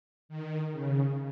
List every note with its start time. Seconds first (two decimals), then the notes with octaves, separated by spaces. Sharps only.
0.29 D#3
0.70 C#3